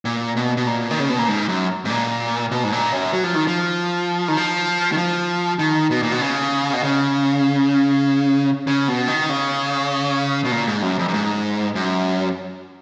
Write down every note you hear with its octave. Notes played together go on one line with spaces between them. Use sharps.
A#2
B2
B2
A#2
D#3
C#3
B2
A#2
G#2
F#2
G#2
A#2
B2
G#2
A#2
F#2
F#3
F3
D#3
F3
D#3
F3
D#3
F3
D#3
B2
A#2
B2
C#3
B2
C#3
C#3
B2
D#3
C#3
B2
A#2
G#2
F#2
F2
F#2
G#2
F#2